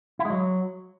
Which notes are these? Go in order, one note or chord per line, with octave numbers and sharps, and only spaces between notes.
E4
G#3
F#3